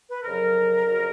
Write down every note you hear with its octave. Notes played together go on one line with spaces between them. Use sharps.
B4
F2 C#3 F#3 A#4
F2 C#3 F#3